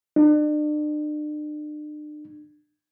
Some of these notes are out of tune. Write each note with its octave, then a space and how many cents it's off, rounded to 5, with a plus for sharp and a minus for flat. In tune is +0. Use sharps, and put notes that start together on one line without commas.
D4 +40